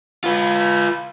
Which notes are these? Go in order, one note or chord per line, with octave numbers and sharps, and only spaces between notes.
F4 B4